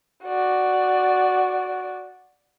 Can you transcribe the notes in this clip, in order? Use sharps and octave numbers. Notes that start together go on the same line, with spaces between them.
F#4 D5